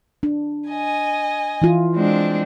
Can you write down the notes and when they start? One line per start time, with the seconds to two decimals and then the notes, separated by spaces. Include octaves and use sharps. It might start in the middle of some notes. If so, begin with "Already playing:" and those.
0.23 D4
0.69 D#5 G#5
1.62 E3 E4 F4
1.95 G#3 C4 D4